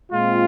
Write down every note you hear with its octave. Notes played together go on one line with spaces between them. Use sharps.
A#2 G#3 C4 F4